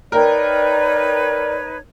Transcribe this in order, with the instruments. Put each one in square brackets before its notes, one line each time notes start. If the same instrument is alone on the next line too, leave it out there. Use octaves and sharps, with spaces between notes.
[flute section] D#4 B4 C#5 [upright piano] A#4 G5 [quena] D5